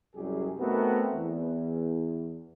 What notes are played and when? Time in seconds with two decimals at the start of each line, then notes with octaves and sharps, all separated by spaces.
0.15 C2 F#2 G3 G4 G#4
0.60 A3 B3 C4 D#4 F#4 A#4
1.14 E2